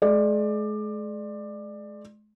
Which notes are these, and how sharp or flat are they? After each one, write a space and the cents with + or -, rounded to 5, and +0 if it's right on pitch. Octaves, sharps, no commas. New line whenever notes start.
G#3 +40 D5 +20